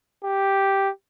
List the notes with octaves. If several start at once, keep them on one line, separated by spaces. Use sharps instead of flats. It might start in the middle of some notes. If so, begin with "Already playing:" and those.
G4